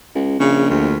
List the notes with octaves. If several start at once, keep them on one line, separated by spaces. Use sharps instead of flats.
C#2
A#1 C#3
D2